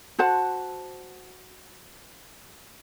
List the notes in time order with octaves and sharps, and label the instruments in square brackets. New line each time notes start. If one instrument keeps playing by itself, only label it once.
[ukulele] F#4 C5 F#5 A5